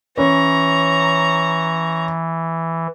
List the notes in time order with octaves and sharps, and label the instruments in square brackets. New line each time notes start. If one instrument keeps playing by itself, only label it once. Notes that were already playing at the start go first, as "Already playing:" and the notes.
[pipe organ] E3 [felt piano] C#4 [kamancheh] A#5 C#6